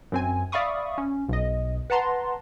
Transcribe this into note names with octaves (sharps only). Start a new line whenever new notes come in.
F#2 C4 G#5
D5 E5 F5 B5 C#6 D#6
C#4
B1 D#5
B4 F#5 A5 A#5 C6